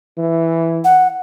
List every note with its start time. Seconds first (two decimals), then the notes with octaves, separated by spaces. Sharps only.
0.18 E3
0.84 F#5